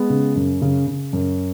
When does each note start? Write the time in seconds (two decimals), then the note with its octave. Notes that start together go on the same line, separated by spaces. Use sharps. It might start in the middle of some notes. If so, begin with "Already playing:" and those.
Already playing: G#3 B3
0.10 C#3
0.36 F#2
0.62 C#3
0.87 C#3
1.13 F#2